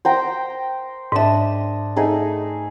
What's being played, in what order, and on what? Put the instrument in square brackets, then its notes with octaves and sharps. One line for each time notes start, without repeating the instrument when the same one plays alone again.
[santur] C5 G5 A#5
[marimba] G#2 E5 [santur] D4 D#5
[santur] A3 D#4 G#4